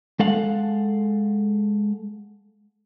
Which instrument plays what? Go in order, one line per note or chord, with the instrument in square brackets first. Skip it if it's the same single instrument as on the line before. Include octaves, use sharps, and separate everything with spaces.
[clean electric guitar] G#3 A4 F5 F#5